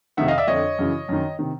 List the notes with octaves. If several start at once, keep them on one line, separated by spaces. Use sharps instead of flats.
F2 C3 D#3 E5 F#5
D#5 F5
D5 E5
F2 D3 C#5 D#5
F#2 C#3 E3
F#2 D#3
C3 D#3